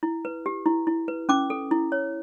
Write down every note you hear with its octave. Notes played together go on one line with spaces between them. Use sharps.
E4
B4
G4
E4
E4
B4
C#4 D6
A4
E4
C#5